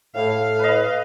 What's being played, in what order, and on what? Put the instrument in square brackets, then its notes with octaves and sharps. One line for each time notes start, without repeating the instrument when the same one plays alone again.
[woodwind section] A2 [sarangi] F5
[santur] B4 D#5